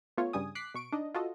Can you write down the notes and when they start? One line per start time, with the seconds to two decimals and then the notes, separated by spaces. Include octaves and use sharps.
0.17 A3 B3 F4 C#5
0.33 G2 C#3 G3 G#5 D#6
0.55 D6 F#6 B6 C7
0.74 B2 C#6 D7
0.92 D4 D#4 D#5
1.14 F4 F#4 A4 D#5